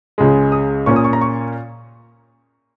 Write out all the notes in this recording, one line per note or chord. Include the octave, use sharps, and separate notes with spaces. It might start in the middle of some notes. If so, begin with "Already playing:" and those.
C#2 C#3 G#3
D#6
A#2 A#3 C#4 C#6
D#6
C#6
A#5
C#6